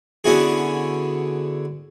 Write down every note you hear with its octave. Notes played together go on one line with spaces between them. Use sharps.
D3 B3 C#4 E4 F#4 G#4